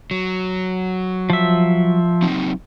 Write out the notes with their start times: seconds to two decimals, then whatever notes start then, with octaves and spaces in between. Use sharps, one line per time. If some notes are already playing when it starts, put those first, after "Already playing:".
0.11 F#3
1.30 F3 E5
2.22 F#3 C4 D#4